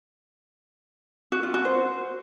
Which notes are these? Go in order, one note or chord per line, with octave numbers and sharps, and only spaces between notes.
F#4
F4
F#4
C5